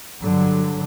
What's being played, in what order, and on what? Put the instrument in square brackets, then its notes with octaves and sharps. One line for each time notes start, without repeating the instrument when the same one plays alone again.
[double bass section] G2 D3 F#3